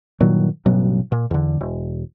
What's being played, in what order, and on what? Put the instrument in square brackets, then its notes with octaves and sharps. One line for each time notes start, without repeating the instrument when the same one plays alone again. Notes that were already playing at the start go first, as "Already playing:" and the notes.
[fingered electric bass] G2 A#2 D#3 F#3
A1 G2 B2 F#3
A#2
E2 D3
E1